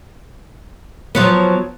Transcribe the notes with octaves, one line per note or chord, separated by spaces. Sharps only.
F3 F#3 B3